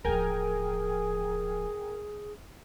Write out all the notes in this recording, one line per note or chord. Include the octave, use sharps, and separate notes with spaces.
D1 F3 G#4 A#4 G5 G#5